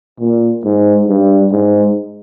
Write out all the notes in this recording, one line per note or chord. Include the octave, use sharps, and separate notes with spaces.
A#2
G#2
G2
G#2